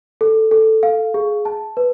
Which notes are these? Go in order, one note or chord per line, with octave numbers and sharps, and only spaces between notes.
A4
A4
F5
G#4
A5
B4